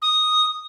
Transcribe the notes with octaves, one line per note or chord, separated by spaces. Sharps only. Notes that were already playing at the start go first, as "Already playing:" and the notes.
D#6